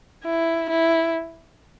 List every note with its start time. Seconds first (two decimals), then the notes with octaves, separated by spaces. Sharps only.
0.25 E4
0.69 E4